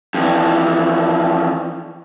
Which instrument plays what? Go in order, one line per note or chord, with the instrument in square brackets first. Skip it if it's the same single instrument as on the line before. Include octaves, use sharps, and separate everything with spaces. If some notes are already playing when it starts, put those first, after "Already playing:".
[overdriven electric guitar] F2 E3